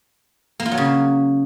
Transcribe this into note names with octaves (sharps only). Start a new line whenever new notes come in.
A#3
F4
F#3
C#3